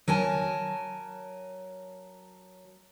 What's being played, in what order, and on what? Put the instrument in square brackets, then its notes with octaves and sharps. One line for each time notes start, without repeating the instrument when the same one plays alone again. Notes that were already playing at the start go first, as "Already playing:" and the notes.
[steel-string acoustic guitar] F#3 A#4 G#5 A5